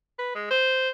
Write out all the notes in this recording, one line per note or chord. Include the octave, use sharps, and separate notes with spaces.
B4
G#3
C5